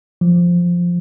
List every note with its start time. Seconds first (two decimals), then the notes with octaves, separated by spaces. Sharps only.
0.21 F3